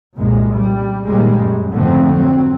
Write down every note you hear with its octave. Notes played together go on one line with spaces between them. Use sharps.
C2 F#2 A#2 G#3
G3
D#2 A#2 G3 G#3
F#2
G#1 F2 D3 A3 C4
F#3 C4